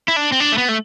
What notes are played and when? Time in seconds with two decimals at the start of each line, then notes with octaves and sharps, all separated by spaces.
0.08 E4
0.16 D4
0.32 C4
0.40 D4
0.52 A3
0.58 B3
0.69 A3